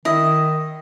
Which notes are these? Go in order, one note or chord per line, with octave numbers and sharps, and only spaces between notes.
D#3 E4 D#5